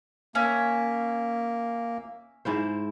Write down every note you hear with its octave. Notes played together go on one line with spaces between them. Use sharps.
A#3 C#4 E5
G#2 E4 C5